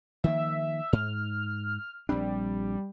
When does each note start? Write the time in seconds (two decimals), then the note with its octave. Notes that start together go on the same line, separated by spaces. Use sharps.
0.24 D#3 F3 A#3 E5
0.93 G#2 F6
2.09 A#1 G3 C4 D4